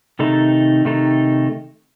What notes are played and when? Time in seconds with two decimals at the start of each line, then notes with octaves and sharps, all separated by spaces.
0.19 C3 D#3 A3 D#4 A4
0.85 C3 D#3 A3 D#4 A4